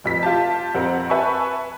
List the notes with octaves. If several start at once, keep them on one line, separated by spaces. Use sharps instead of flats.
F1 F2 B6
F4 G4 A5
F2 C4 A#4 F#5
B4 E5 G#5 A5 C#6